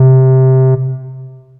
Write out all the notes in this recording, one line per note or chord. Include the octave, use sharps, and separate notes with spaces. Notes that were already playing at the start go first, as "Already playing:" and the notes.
Already playing: C3